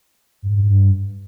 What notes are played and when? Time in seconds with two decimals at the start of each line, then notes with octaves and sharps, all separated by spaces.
0.42 G2
0.49 G#2
0.55 G2
0.62 G#2
0.69 G2